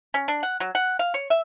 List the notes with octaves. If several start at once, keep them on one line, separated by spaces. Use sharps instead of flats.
C#4
D4
F#5
F#3
F#5
F5
C#5
E5